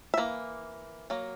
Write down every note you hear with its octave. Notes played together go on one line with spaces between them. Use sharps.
E5
E3 A#3
F#3 A#3